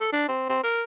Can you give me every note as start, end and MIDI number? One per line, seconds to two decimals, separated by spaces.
0.01 0.11 69
0.12 0.24 62
0.28 0.47 60
0.49 0.61 60
0.63 0.83 70